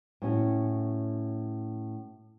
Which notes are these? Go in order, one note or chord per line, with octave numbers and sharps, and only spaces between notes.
A2 C#4 F#4